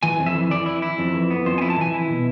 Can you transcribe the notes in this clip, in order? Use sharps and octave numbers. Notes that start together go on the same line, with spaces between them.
E3 G#5
F2
E5
E3
E3 D5
E4
E4
F2
E3
B3
F2 C5
G#5
E4
A5
E3 G#5
E4
B2